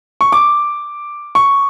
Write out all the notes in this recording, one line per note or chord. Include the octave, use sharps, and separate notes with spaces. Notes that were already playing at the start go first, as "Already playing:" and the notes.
C#6
D6
C#6